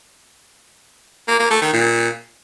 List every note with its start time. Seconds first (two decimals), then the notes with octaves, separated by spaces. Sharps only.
1.28 A#3
1.39 A#3
1.51 A3
1.62 D#3
1.73 A#2